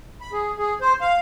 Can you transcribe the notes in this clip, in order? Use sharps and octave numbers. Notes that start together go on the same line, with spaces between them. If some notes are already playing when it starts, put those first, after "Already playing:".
B5
G#4
G#4
C5
F5